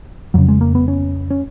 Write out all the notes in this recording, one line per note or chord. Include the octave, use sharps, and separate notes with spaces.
F2 C#3 F#3
G#3
A#3
B3
C#4
C#4